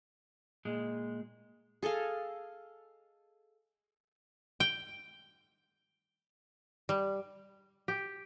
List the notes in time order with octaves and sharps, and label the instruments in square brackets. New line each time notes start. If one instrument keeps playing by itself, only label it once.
[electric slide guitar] A#2 G#3
[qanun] G#4 A4 D#5 F5
[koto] G5
G3
[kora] G4